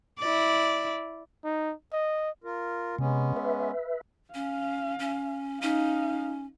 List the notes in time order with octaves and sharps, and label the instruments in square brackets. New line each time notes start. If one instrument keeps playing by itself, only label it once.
[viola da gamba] E4 D5
[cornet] D#4
D#5
[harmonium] F4 A#4
[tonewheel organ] C3 [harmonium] G#3 B3 C#4
[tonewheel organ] B4 E5
[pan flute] C#4 [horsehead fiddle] F5
[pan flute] C#4
[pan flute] C#4 [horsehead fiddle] D#4 F5